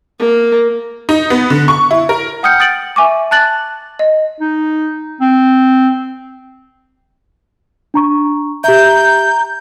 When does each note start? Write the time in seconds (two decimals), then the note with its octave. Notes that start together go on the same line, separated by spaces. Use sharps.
0.19 A#3
1.09 D#4
1.30 B3
1.50 D3
1.68 C#6
1.91 E4
2.09 A#4
2.43 F#5 G5 D#6 F6 G6 C#7
2.60 D#6 A6 D7 F#7
2.96 E5 G#5 C#6 D6
3.31 A5 F#6 A6 F#7
3.99 D#5
4.41 D#4
5.21 C4
7.94 D4 A#5 C#6
8.64 G4 E5 A#5 G6